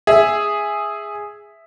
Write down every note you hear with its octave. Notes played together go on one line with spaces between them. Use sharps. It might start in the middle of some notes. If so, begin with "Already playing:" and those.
G#4 E5